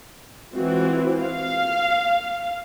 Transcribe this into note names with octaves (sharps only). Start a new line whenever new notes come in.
E3 G#3 C4 F4 F#4
F5